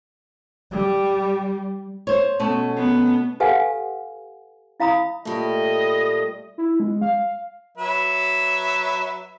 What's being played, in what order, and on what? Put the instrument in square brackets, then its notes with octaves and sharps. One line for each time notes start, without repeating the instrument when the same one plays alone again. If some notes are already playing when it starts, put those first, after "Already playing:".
[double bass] G3
[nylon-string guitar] C5 C#5
B2 A3 C#4
[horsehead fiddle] B3
[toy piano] G4 A4 B4 F5 F#5 G#5
E4 F5 A#5 B5 D#6
[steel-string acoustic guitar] A#2 G3 [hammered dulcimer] A3 B5 [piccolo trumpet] D#5
[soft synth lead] E4
G#3
F5
[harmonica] F#3 B4 E5